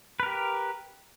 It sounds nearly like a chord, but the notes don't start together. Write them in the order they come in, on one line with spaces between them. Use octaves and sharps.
B4 A#4 G4